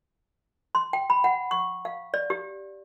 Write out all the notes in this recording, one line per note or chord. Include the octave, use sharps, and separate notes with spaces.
C6
G5
B5
F#5
C#6
F5
D5
G4